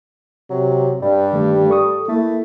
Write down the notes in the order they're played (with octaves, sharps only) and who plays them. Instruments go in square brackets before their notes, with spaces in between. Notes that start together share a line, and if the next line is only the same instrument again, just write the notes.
[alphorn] C3 [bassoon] F#3
[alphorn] G2 [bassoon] G3
[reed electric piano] D#3 A3
A4 C#6 D#6
[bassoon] A3 [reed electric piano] A#3 [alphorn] E4